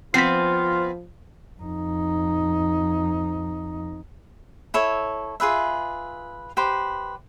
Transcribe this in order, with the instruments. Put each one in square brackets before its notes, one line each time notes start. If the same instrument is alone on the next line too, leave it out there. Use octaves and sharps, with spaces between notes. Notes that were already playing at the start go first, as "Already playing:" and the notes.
[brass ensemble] F3 [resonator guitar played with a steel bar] B3 C4 [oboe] F4 [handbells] B6 C7
[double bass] F2 D#4
[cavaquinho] E4 A4 C#5
F4 G#4 B4 E5
G4 B4 C5